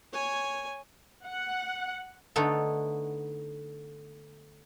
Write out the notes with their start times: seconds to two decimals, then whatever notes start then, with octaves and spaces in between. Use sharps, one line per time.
0.13 C#5 G#5
1.26 F#5
2.36 D3 A3 B3 D#4 A4